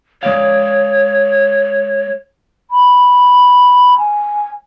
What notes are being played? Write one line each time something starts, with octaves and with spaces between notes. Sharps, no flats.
G#3 C#5 D5 F5
B5
G#5